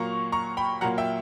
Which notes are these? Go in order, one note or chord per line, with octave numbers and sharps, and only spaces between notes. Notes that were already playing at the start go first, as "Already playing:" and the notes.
Already playing: A#2 F#3 A#3 A#5 C#6
A#5 C#6
G5 B5
A#2 F#3 A#3 F#5 A#5
E5 G5